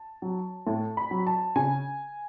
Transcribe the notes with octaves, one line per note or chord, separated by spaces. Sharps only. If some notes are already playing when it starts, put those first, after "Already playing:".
Already playing: A5
F#3
A2 A5
B5
F#3
A5
C#3 G#5